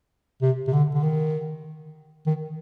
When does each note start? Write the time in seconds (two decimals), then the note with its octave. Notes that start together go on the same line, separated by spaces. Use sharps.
0.42 C3
0.67 C3
0.73 D3
0.95 D3
1.03 D#3
2.26 D#3